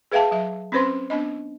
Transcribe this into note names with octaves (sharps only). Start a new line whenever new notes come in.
G#4 B4 E5 F5 G5 A5
F#3 E5
C4 C#4 B4 C5 C6
B3 D4 D#5